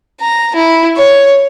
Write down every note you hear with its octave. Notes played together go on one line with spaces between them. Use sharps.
A#5
E4
C#5